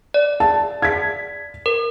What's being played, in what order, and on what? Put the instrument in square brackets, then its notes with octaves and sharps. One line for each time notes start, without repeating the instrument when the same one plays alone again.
[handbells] D5
[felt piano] A5
G#6 B6
[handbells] A#4